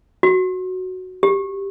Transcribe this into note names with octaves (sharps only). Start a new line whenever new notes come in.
F#4
G4